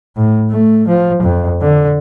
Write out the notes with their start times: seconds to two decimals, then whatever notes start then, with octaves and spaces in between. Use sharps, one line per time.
0.17 A2
0.51 A3
0.87 F3
1.23 F2
1.61 D3